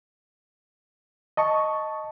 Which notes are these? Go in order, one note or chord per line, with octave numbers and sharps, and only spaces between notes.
D#5 A5 C#6